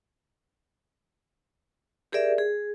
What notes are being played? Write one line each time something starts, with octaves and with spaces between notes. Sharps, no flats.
G4 G#4 A#4 D5 E5
G#4